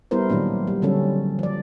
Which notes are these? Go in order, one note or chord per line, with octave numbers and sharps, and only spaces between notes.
G3 B3 E4 A#4 C5
A#2 D#3 F#3 A#3 D4
G3
D3 F#3 G3 C#4 A4
F3 D5